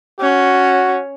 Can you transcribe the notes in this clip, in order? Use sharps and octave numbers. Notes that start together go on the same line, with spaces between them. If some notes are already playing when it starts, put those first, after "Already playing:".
C#4 F#4